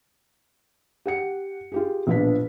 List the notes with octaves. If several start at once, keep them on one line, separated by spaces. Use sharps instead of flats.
G4 F#5 C#7
F4 G4 G#4
A#1 B2 F3 B3 D4 B6